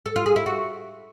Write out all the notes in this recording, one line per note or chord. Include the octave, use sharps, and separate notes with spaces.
A4
F4
G#4
E4
F#4